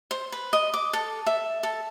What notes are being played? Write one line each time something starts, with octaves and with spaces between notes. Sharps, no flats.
C5
B4
D#5
D6
A4
E5
A4